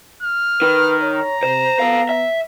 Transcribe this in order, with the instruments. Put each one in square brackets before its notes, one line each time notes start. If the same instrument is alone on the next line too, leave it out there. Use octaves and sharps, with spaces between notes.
[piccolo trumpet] F6
[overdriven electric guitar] D#3 [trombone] B4
[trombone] C#5 [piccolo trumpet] A#5
[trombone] C3 [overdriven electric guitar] C5
[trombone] B3 [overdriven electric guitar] A4 F5
[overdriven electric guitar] E5